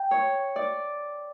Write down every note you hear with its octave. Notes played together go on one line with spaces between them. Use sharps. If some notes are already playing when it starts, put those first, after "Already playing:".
Already playing: G5
C#5
D5